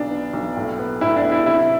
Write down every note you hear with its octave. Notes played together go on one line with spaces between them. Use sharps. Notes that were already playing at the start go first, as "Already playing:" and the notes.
Already playing: B1 B3 D4
B3
B1
A2
B3
A2 E4
D4
B3
E4
C3 E4